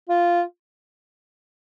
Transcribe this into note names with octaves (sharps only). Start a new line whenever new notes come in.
F4